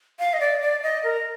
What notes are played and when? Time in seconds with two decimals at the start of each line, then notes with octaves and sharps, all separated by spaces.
0.19 F5
0.33 D#5
0.40 D5
0.62 D5
0.83 D#5
1.04 A#4